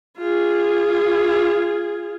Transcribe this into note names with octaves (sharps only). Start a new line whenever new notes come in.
F4 G#4